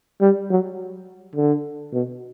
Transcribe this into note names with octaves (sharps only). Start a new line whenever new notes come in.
G3
F#3
D3
B2